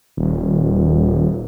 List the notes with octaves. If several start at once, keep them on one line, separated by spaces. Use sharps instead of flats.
D#1